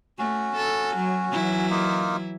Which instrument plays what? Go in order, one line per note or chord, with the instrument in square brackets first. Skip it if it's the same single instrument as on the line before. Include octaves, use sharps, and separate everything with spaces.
[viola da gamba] A3 [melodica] C#4 F#4
[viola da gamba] A4
F#3
E3 F#3 E4
[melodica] A#3 D#4 F4